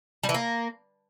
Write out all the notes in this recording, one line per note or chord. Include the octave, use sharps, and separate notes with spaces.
G3
E3
A#3